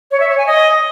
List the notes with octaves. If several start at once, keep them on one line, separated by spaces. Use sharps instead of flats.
C#5
E5
C#5
G#5
D#5